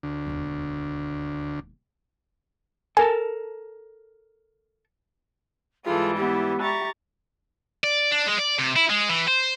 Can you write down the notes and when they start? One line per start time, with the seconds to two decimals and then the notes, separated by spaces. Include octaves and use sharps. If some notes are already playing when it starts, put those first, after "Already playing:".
0.03 D2
0.26 E1 D#2
2.97 A4 A#4 G#5 A5
5.85 G#2 E3 G3 F4 G#4 A4
6.17 B3 E4 G4
6.62 G4 E5 A#5 C#6 A6
7.84 D5
8.12 D4
8.28 G#3
8.39 D5
8.59 C3
8.76 E4
8.90 G#3
9.10 E3
9.28 C5